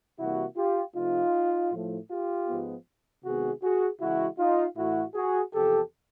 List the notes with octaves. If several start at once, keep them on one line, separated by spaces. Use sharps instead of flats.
C3 E3 G3 A#3 E4 F#4
F4 G4
C3 F3 A3 D#4 F4
A2 F3 A3
F4 G4
G#2 F3 G#3 B3
C3 D#3 G#3 B3 F#4 G#4
F#4 G#4
C#3 E3 G#3 E4 F#4
D#4 F4
A2 E3 A3 E4 F#4
F#4 G#4
E2 C3 F3 G4 A4